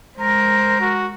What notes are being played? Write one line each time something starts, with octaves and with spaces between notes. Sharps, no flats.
G#3 A#4 C5
F#4